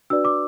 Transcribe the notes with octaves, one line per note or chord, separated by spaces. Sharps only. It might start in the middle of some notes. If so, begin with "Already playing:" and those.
D4 F#4 B4 D5 E6
D6